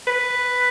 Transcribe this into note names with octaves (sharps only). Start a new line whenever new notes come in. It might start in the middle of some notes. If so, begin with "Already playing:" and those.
B4